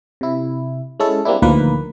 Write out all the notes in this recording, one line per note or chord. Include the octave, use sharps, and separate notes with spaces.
C3 E4
G#3 C#4 E4 A4
G3 A#3 C4 D4 E4
D2 A#2 D#3 F3 A#3 B4